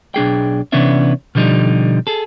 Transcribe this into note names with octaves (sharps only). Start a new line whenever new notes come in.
B1 D4 G#4 G5
C3 E3 B3 C#4 D4 E5
B2 D3 F3 G3 D#4
G#4 A4